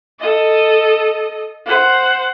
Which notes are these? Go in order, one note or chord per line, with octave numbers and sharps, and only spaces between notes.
A4 D#5
C5 F#5